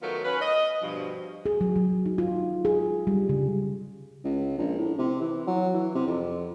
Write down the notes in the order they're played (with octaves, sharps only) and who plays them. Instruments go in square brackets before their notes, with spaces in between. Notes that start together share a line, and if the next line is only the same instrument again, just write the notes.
[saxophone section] D#3 F#3 A3 B3 F4 A#4
C#4 B4
D#5
G2 B2 F3
[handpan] G#4
F#3
F#3
D#4
F4
G#4
G3
C#3
[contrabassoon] C#2
A#1
A2
C3
E3
F#3
E3
C3
F2